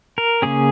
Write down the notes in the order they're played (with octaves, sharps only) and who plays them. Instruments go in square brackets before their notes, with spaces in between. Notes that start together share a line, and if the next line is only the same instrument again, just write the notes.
[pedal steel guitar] A#4
C#3 A#3 C#4 G#4